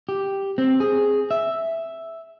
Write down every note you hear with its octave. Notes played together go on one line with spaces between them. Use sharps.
G4
C4
G#4
E5